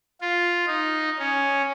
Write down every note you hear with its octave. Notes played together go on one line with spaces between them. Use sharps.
F4
D#4
C#4